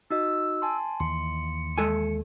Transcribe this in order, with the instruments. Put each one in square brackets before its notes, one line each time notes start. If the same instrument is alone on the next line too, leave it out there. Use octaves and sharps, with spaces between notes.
[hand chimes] D#4 F#4 D#5 [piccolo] E6
[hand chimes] G#5 A5 C6
[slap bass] D#2 E3 [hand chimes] C6 [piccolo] C#7
[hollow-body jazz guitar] G#3 A4 G#5